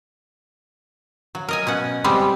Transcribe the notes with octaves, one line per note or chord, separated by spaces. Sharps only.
F#3
A#4 D#5 G#5
B2 C#4 F#5
G3 G#3 B3 C4 G4